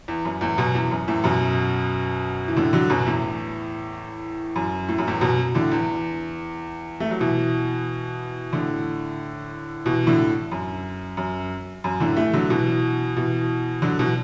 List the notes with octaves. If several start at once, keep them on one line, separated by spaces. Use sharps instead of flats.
E2
F#2
E2 A2
F#2 B2
E2
F#2
E2 A2
F#2 B2
E3
A2 D3
D3 F#3
F#2 B2
E2 A2
F#2
A2
F#2
E2 A2
F#2 B2
A2 D3
E2
A3
F#3
B2 E3
A2 D3
B2 E3
A2 D3
F#2
F#2
F#2
A2 D3
E3 A3
D3 F#3
B2 E3
B2 E3
D3 F#3
B2 E3